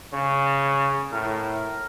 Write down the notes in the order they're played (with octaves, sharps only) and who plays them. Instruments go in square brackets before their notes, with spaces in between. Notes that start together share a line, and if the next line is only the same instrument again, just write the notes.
[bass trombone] C#3 [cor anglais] C#5
[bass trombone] A2 [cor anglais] A#4